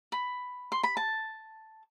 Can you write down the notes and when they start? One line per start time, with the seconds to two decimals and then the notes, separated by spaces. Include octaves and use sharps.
0.12 B5
0.72 C6
0.83 B5
0.97 A5